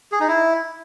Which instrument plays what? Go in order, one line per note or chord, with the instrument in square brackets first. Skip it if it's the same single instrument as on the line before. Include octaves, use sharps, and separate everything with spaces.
[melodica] G#4
D#4
E4